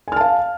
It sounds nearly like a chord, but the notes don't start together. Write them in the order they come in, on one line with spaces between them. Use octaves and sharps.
G#5 F6 A5 F5